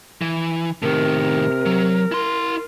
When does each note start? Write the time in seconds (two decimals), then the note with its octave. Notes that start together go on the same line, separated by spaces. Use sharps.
0.21 E3
0.82 A2 C3 D#3 A#4
1.66 F#3
2.12 E4 C6